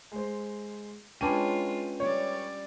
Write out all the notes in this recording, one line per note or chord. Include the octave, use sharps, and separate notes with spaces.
G#3 C5
G#3 C#4 D4 F4 B4 G5 D#7
G3 C#5 D5